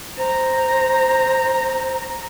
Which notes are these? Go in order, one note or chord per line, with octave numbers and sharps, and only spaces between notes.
C5 A#5